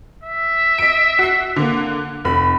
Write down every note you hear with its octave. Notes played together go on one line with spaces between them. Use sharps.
E5
D#5 D7
F#4 C7
D3 A#3
F1 B5